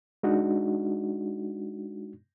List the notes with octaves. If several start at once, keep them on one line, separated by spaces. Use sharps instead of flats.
G#3 D4 D#4 F#4